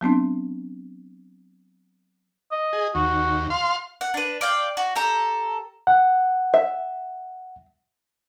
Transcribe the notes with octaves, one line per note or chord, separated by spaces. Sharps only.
F#3 B3 C4 D4
D#5
G#4
D#2 F#4
F5 C6
F#5
D4 B4
D5 F5 G5
F#4
G4 A4 A#5
F#5
E5